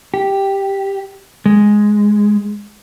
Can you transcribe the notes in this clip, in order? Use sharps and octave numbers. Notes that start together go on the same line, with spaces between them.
G4
G#3